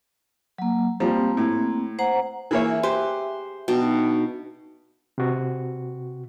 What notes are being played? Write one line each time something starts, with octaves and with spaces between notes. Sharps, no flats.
F#3 A#3
F3 G3 A#3 C4
A2
C5 F#5 A#5
E3 A#3 G#4 C#5 E5
G4 B4 C5
B2 D4 D#4 G5
C3 F#4